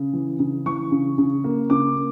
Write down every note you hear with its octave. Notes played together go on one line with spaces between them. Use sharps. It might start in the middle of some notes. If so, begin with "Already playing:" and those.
Already playing: C#3
E3
C#3
E3 C#6
C#3
C#3
A#3
C#3 D6
A#3